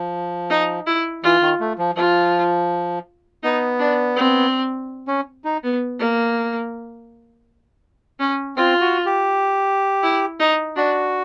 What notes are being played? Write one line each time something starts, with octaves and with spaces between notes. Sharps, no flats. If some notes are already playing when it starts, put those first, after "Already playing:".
Already playing: F3
D#4
E4
E3 F4
D#3
A3
F3
F3 F4
B3 D#4
D4
C4
C#4
D#4
B3
A#3
C#4
C4 F4
F#4
G4
E4
D#4
D4 F#4